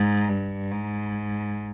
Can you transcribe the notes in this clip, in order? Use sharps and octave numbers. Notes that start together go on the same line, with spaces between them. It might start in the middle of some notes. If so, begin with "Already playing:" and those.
Already playing: G#2
G2
G#2